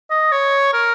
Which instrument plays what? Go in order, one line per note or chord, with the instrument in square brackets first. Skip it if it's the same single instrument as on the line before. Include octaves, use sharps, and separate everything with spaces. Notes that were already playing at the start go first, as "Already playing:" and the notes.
[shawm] D#5
C#5
A#4